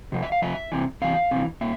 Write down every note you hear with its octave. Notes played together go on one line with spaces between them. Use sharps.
C3 F3
E5
F5
C3 F3 E5
C3 E3
C3 E3 F5
C3 E3
A#2 E5